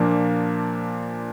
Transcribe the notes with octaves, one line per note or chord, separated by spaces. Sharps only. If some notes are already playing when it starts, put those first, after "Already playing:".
Already playing: A#2 F3 A#3 D4